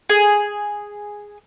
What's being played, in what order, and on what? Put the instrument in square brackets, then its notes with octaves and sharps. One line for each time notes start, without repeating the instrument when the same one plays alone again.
[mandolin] G#4